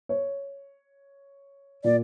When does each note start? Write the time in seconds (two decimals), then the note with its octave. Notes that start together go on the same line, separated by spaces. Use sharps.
0.09 C#5
1.84 A#2 D5